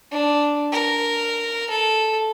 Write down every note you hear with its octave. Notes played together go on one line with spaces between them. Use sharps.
D4
A#4
A4